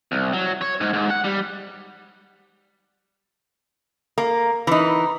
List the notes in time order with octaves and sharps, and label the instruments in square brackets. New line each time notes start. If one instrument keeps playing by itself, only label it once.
[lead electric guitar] C2
F#3
C#5
G#2
G#2
F#5
G3
[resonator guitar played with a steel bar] A#3
E3 D#4